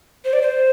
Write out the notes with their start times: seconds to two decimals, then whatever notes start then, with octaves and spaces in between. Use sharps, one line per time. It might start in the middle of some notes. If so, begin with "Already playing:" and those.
0.25 C5
0.33 D5
0.42 C5